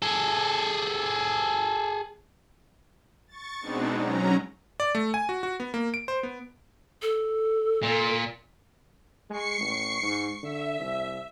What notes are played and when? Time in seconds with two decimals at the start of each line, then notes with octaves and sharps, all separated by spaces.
0.02 G#4 A4
3.28 C#6 A6
3.61 B2 G#3 B3 C4 D4 D#4
3.98 F#3 C#4 A#5
4.80 D5
4.95 A3
5.14 G#5
5.29 F#4
5.43 F#4
5.60 B3
5.74 A#3
5.94 D7
6.08 C5
6.23 B3
7.02 A4
7.82 A#2
9.30 G#3 C#6 C7 C#7
9.61 A1
10.02 G#2
10.43 D3 E5
10.80 C2